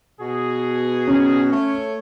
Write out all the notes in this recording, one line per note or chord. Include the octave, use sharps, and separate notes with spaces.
B2 F#4 G#4
C#4
A3 C#5